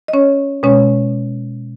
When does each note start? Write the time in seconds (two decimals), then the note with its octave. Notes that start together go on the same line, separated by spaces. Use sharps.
0.08 D#5
0.13 C#4 C#5
0.63 B2 G#3 C#4 C#5